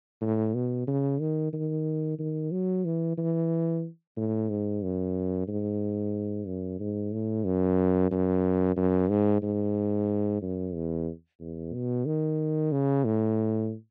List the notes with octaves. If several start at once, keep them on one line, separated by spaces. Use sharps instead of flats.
A2
B2
C#3
D#3
D#3
D#3
F#3
E3
E3
A2
G#2
F#2
G#2
F#2
G#2
A2
F#2
F#2
F#2
G#2
G#2
F#2
E2
E2
B2
D#3
C#3
A2